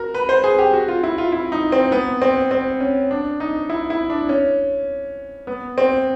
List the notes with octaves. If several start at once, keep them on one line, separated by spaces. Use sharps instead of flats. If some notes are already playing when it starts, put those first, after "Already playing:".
Already playing: F#4 A#4
B4
C5
G#4
G4
F#4
F4
E4
F4
E4
D#4
C4
B3
C4
C4
C#4
D4
D#4
E4
E4
D4
C#4
B3
C4